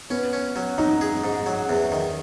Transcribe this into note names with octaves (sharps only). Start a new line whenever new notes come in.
B3 C#4
C#4
F#3
F#3 D#4
G#4
G#2
F#3
E2
D#3